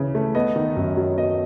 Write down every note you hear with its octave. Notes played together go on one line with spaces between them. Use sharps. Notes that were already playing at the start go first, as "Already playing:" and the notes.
Already playing: C#3 E3
A3
B3 D#5
D#3
F#2
F#3
B3 D#5